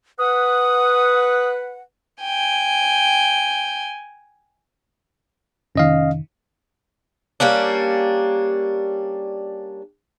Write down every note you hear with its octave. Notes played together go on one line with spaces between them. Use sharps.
B4 F#5 D#6
G5 G#5
F1 D#3 C#4 D#5 F5
G3 A#3 C#4 D4